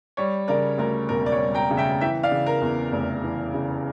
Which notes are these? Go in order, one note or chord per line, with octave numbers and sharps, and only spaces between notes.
G3 C#5
C#3 A#4 D5
D2 A#4
E1 A#4
D5
C#5
G3
G5 A#5
C#3
E5 G5
E3 E5 G5
D5 F5
C#3
A#4
E2
F1
E3
C#3